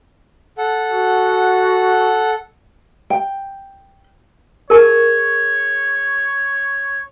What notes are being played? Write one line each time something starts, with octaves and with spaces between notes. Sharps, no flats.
A4 F#5
F#4
G5
G#4 A#4 C#5 A5